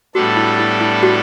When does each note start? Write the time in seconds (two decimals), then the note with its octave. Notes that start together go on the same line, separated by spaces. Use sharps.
0.15 A2 G3 B3 D4 F#4 A4
0.37 E4
0.59 E4
0.81 E4
1.03 F#4